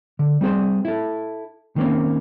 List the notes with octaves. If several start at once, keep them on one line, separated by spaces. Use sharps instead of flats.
D3
G3 C4 G#4 C5
E4 A4
D#3 A#3 C4 C#4